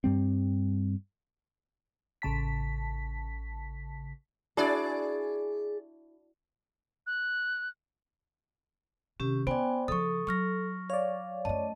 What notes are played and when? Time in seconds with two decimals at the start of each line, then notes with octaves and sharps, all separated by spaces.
0.04 G2 G3 C4
2.22 A1 C#3 A5 B6
4.57 D4 E4 F#4 G#4 D5
7.07 F#6
9.20 C3 D#3 C#4 G4
9.47 B3 C#4 C5 D5 G5 G#5
9.88 C#3 F3 A4 C#6 D#6
10.27 F#3 C#6 F6 A#6
10.90 C#5 D5 F5
11.45 F#2 A3 D#5 A5